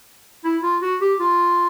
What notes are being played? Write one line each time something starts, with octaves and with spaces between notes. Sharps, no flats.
E4
F4
F#4
G4
F4